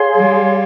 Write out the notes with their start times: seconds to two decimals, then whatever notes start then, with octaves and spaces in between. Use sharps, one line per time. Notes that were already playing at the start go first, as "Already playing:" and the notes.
Already playing: G#4 C#5 F5 C6
0.16 G3